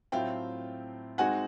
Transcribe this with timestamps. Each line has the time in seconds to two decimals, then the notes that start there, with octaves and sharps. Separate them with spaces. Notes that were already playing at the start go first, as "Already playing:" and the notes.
0.12 A2 F#3 A3 C4 F4 F5 G5
1.18 G#3 C4 D#4 F#4 F#5 G#5